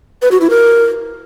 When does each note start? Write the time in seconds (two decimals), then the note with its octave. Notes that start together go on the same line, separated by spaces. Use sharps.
0.22 B4
0.31 F#4
0.41 E4
0.50 A#4